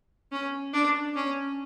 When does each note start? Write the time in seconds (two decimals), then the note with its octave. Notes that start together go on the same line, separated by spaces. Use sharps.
0.32 C#4
0.73 D4
1.16 C#4